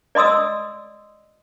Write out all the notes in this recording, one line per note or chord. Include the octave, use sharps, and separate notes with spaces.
D5 D#5 C6 D#6 E6